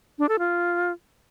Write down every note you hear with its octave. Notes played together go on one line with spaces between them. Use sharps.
D4
A4
F4